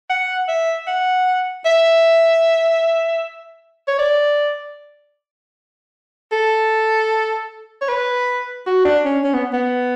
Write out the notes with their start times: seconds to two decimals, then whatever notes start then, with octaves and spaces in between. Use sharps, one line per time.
0.10 F#5
0.48 E5
0.87 F#5
1.65 E5
3.88 C#5
3.99 D5
6.32 A4
7.81 C#5
7.88 B4
8.66 F#4
8.85 D4
9.05 C#4
9.24 C#4
9.34 B3
9.53 B3